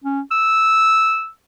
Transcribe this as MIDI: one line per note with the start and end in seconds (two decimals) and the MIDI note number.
0.04 0.20 61
0.31 1.29 88